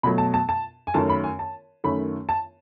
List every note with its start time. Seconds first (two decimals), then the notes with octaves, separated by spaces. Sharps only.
0.03 B2 F#3 A3 B5
0.18 A5
0.34 A5
0.49 A5
0.87 G#5
0.94 F#2 D#3 A3 C#4 A5
1.09 B5
1.24 G#5
1.39 A5
1.84 F#2 D#3 A3 C#4 B5
2.29 A5